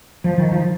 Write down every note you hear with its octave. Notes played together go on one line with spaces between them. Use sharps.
F3
D#3
F3